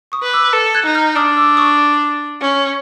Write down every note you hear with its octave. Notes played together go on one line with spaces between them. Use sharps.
C#6 D#6
B4
D6 E6
A4
F#6 G#6
D#4
F6 G6
D4 D#6 F6
D6 E6
C#6 D#6
C#4